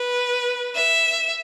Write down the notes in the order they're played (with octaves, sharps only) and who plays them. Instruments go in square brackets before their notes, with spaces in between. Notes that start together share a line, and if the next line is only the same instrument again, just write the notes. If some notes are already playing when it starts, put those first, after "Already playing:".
Already playing: [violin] B4
E5